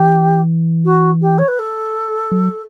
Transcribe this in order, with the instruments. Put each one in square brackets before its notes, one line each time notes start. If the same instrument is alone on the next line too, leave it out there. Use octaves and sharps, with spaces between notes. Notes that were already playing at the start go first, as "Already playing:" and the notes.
Already playing: [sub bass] E3 [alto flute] G4
[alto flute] F#4
G4
C#5
B4
A4
[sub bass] F#3